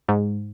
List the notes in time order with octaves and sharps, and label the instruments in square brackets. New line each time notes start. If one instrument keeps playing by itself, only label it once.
[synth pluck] G#2